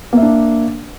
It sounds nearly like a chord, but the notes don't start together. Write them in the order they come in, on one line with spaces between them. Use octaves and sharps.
A#3 E5 D4